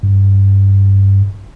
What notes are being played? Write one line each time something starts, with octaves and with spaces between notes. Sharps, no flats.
G2